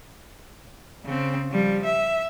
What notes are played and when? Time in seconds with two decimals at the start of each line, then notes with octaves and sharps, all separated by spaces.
1.05 C#3 C4
1.51 F3 G3
1.84 E5